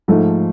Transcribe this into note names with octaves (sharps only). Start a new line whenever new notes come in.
G#2 F3 A3